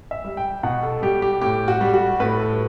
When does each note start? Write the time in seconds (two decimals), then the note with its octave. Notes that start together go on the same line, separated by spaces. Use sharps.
0.11 E5
0.25 G3
0.37 G5
0.63 B2 F#5
0.83 A4
1.02 G3 G4
1.22 G4
1.42 A2 G4
1.68 F#4
1.81 G3
1.94 F#4
2.20 A2 B4
2.39 A4